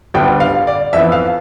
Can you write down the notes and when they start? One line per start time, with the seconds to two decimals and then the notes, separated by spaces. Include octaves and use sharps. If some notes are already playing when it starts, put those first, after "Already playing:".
0.14 D2 D3 G3 B3 G5
0.40 F5
0.67 D5
0.93 F2 E3 B3 E5
1.12 F5